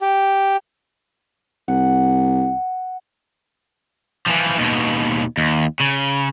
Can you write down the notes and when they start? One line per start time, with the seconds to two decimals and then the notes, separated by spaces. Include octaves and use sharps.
0.01 G4
1.68 C2 F#5
4.27 E3 F3
4.58 D#2 B2
5.37 D#2
5.80 C#3